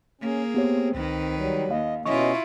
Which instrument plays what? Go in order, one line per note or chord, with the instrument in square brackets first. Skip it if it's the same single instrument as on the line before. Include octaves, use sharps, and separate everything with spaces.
[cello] A#3 G#4 [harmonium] C#4
[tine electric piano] B3 G4 C#5 [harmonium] C4
[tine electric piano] C#2 [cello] D#3 B4
[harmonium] F#3 G3
[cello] D#2 [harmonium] D#5 [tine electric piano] F5
[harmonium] B2 C#4 D#5 [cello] E4 F4 [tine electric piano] C#6